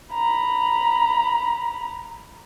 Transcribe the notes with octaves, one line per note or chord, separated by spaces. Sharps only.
A#5 B5